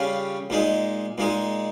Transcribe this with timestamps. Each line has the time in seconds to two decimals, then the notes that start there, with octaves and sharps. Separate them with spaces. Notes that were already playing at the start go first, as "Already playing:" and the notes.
Already playing: C#3 G3 C#4 F4
0.50 A#2 G#3 D#4
1.18 A#2 G#3 D#4